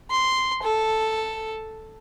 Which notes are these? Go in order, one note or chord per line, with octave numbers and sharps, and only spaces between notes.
C6
A4